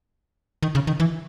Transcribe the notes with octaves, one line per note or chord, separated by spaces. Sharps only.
D#3
C#3
D#3
E3